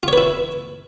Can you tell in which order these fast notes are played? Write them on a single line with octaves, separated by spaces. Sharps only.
F4 C#5 B4 E4